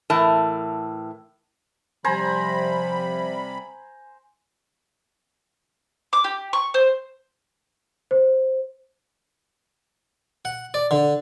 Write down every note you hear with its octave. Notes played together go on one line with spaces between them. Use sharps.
A2 E3 A#4 A5
C3 F3 G3 C5 G#5 A#5 B5
D6
G4
C#6
C5
C5
F#5
D5
D3